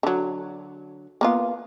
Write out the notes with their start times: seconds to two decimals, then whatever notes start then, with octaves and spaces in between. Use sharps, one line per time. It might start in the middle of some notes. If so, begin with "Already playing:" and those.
0.03 D3 F#3
1.21 A#3 B3 F4